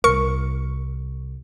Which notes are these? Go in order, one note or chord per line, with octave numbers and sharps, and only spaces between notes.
C2 A#4 C#6 C#7